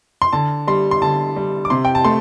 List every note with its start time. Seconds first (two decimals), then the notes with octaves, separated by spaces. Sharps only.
0.22 C6
0.33 D3 A5
0.67 G3 C6
0.91 C6
1.02 D3 A5
1.36 G3
1.65 D6
1.70 C3 C6
1.85 G5
1.95 A5
2.05 A3 C6